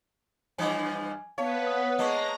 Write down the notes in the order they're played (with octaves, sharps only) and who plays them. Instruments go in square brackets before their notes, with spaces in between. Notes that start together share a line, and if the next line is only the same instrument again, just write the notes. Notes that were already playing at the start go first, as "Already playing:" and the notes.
[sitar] G2 E3 F3 [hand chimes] G#5
[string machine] B3 B4 [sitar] C#5 [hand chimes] F5 A5
[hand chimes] F#5 D#6
[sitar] G#3 A#3 [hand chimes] D#5 A5 C#6 [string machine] A#5 A#6